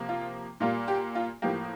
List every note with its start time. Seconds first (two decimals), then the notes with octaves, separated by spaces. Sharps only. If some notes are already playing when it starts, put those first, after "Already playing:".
Already playing: C3 F3 A#3
0.09 F4
0.60 A#2 G3 A#3 F4
0.88 G4
1.15 F4
1.42 A2 F3 A#3 G4